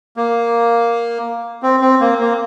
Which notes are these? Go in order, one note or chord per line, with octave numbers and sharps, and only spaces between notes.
A#3
C4
C4
A#3
A#3